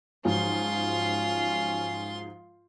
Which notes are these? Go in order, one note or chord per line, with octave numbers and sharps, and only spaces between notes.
G#2 F3 F#3 C#4 F4 C6